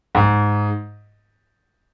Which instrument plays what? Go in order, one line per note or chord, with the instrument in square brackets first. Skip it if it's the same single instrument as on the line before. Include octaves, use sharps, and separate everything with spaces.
[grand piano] G#2